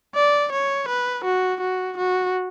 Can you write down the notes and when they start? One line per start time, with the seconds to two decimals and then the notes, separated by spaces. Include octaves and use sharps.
0.15 D5
0.52 C#5
0.88 B4
1.25 F#4
1.61 F#4
1.98 F#4